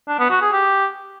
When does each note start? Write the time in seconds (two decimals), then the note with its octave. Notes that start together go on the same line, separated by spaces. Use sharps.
0.08 D4
0.19 B3
0.30 F#4
0.41 G#4
0.53 G4